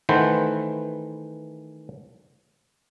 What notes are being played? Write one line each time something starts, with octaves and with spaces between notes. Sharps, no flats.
D#3 E3 A3 B4 C5 F#5